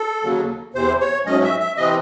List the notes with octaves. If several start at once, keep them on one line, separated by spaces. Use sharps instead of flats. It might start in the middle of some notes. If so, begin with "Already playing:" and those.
Already playing: A4
D#2 C#3 F#3
E2 C3 E3 C5
C#5
G#2 F#3 A3 C#4 D#5
E5
E5
C3 E3 C4 D#5